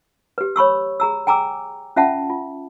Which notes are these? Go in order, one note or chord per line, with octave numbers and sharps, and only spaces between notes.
G4 B4
C#5 B5 C#6 E6
G#4 A#5 E6
G5 G#5 A#5 D6 E6
C#4 F4 E5 F#5 A5
F4